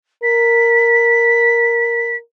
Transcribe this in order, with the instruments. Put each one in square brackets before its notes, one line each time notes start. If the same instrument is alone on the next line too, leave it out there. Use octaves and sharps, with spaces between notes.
[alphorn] A#4 [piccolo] B6